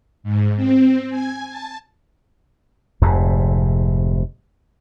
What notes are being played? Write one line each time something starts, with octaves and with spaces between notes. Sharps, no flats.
G#2
C4
G#5
A5
F1 F2 G#2 C3